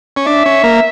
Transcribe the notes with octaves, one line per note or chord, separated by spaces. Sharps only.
C#4
D4 E5
C#4
A#3